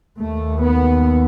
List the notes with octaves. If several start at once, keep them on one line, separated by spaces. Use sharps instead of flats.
D#2 A3
B3